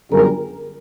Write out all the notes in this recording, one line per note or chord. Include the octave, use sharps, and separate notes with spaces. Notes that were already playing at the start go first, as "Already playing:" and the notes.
G1 F#2 D3 G3 G#4 A#4